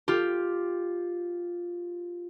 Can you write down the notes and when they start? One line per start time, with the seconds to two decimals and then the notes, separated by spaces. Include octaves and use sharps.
0.08 F4 G4